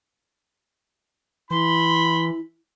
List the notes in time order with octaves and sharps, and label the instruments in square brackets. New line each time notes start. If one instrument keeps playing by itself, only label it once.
[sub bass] E3 [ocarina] E4 [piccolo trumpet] B5 [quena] C6